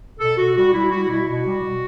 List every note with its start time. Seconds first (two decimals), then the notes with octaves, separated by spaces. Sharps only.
0.20 B2 A4
0.37 B2 F#4
0.55 G3 F#4
0.73 G3 E4
0.90 G3 F#4
1.08 B2 E4
1.27 B2 F#4
1.44 G3
1.61 B2